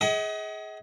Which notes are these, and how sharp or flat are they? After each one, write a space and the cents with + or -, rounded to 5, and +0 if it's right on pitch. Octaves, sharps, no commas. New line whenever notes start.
G#4 +15 D#5 +40 F#5 +45